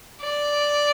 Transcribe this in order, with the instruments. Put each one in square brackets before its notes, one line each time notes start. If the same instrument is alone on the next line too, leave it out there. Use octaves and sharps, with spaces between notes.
[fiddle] D5